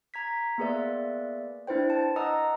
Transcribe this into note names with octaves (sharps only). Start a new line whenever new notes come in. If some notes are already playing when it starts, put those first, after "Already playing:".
A#5 G#6 B6
A#3 B3 G#4 B4 D5 E5
D4 E4 B4 C5 G5
A5
B4 D#5 F#5 A#5 D#6 E6